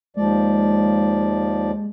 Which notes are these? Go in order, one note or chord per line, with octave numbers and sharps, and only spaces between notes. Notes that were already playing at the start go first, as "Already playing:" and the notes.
D#2 F3 G#3 D5